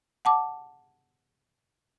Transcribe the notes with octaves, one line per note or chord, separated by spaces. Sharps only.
F#5 A5 D6